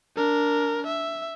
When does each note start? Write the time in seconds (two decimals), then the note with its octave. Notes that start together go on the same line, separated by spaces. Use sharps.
0.16 D4 A#4
0.87 E5